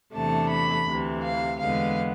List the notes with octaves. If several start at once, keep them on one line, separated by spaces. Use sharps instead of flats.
E2 C3 E3 A3 D4 A5
B5
D2 C3 E3
F5
E2 D3 G#3 B3 F5